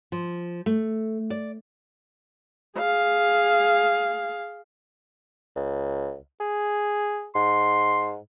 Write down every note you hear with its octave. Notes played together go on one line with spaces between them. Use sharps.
F3
A3
D5
G#4 F5
C#2
G#4
G#2 C6